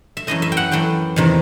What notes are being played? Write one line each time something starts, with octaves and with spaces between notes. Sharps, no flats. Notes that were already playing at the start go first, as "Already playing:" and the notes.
E5
F#2 E3 A3 D#5
E5
G5
F#5
F#2 E3 A3 G5
E2 C3 D#3